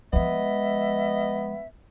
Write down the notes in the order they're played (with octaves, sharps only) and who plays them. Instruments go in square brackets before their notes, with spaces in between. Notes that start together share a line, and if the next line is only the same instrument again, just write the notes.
[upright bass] F3 G#3 [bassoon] B3 [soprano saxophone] D#5 [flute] E5